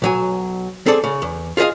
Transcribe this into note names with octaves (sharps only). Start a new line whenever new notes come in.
B1 F#3 G#5
C4 G#4 A4 D5
C#3
E2
F4 G#4 A#4 D#5 F5